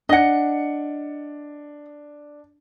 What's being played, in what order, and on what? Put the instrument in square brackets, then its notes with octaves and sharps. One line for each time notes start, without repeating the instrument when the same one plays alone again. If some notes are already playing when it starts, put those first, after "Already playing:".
[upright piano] D4 C#7 [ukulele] D#5 F#5